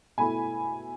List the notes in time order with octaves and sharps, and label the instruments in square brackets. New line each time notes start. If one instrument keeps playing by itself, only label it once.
[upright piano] B2 A3 E4 G#5 B5